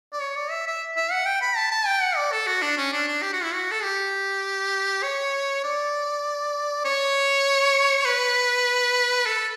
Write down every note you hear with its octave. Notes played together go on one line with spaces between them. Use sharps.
D5
C#5
D5
E5
E5
E5
F#5
G5
B5
A5
A5
G5
F#5
D5
A4
F#4
D4
C#4
D4
D4
G4
F#4
E4
F#4
A4
G4
C#5
D5
C#5
B4
A4